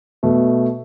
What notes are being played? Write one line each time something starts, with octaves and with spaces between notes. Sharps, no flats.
B2 A3